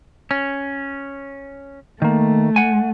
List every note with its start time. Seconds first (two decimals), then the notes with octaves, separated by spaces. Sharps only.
0.31 C#4
2.02 D#3 A3 A#3
2.56 F#5 G#5